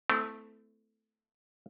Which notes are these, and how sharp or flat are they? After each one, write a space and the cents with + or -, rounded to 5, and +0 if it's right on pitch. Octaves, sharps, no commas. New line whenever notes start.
A3 +0 C4 -40 E4 -15